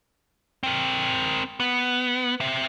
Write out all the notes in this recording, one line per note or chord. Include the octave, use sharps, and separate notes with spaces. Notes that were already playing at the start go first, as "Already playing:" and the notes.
C4 A#4
B3
C4 E5